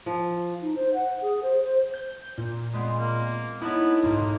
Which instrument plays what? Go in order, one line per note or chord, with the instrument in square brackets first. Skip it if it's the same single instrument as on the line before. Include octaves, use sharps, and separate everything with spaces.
[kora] F3
[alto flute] D#4
C5
F#5
G#4
C5
C5
[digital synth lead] G6
A#2
[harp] G#3 B3 C4
[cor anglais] A#3
[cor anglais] B3 [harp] D#4 A4 C#5 [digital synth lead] E4
[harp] B1 G#2 [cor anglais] A#3